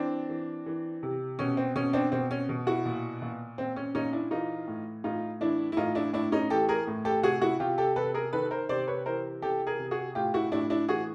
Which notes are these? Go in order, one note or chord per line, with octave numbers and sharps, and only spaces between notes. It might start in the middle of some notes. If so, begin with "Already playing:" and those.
Already playing: E3 C4 D4
E3
E3
C3
B2 C#4
C4
B2 C#4
C4 D4
B2 C4
C#4
B2
E4 F#4
A#2
A#2
A#2 C4
C#4
A#2 C#4 D#4
D4 E4
E3 D#4 F4
A2
A2 D#4 F4
E3 D4 E4
E4
A2 D#4 F4
D4 E4
A2 D4 E4
C#4 D#4
E3 G4 A4
G#4 A#4
A2
G4 A4
C3 F#4 G#4
E4 F#4
C3 F4 G4
G4 A4
C3 A4 B4
G#4 A#4
D#3 A4 B4
A#4 C5
C3 C5 D5
B4 C#5
E3 A#4 C5
C3 G4 A4
G#4 A#4
C3
F#4 G#4
A2 F4 G4
E4 F#4
A2 D4 E4
D4 E4
E3 F#4 G#4